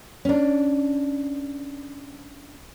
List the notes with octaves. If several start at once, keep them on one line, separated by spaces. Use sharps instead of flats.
C#4 D4